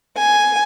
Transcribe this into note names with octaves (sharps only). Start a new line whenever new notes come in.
G#5